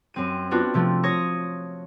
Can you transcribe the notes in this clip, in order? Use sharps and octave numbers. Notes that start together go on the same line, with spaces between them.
F#2 C4 D#7
B3 C4 D4 F4 F#4
C3 F3 A3 D4
C#5 C#6 D#6 A#6